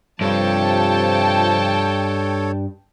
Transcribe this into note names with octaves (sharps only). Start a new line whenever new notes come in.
G2 C3 F3 A4 C#5 G5 A5